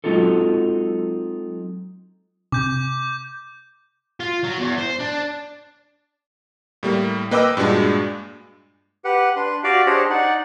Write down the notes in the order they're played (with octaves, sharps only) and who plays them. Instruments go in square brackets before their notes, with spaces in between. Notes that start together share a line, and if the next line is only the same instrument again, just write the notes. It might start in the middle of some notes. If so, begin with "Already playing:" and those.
[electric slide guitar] F#3 G#3 C4 D#4 F4 A4
[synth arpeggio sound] C3 [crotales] D6 G6
[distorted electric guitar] F4
F#3
E2
C5
D4
[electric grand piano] A2 G3 A#3
A#3 B4 D#5 G5 D6 E6
G2 A#2 G#3 D4 F#4
[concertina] G4 B4 F#5
D4 B4 C6
F#4 G4 D5 F5 G5
D4 G4 G#4 C5 C#5 D#5
D#4 D5 F#5